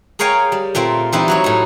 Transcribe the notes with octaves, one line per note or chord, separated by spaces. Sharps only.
G#4 A#4 C#5 F5 G5 G#5
G3
A#2 A3 C4 F4
E3 G3 C4 D#4 E4
F#3 F#4 C#5
A2 D#4